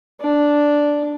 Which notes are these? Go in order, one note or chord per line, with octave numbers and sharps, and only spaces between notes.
D4